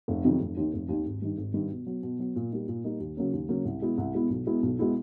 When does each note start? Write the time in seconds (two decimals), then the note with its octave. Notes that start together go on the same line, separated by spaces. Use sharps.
0.08 F1
0.24 F2 C3 D#3 F#3
0.41 F1
0.57 D#2 D#3
0.73 F1
0.89 D#2 D#3
1.05 G#1
1.22 G2 D#3
1.38 G#1
1.54 G2 D#3
1.70 B2
1.86 F#3 B3
2.03 B2
2.19 F#3 B3
2.36 A#2
2.51 G3 A#3 D#4
2.68 A#2
2.84 G3 A#3 D#4
3.00 D#2
3.17 C#3 F#3 A#3 C#4
3.33 D#2
3.49 C#3 F#3 A#3 C#4
3.65 C2
3.81 B2 G#3 B3 E4
3.98 C2
4.14 B2 G#3 B3 E4
4.30 B1
4.47 B2 G#3 B3 E4
4.63 B1
4.79 B2 G#3 B3 E4